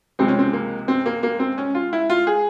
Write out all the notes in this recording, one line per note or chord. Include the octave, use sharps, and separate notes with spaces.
C#2 C3 F3 G#3 C4
C#4
C4
A#3
C4
A#3
A#3
C4
C#4
F4
E4
F4
G#4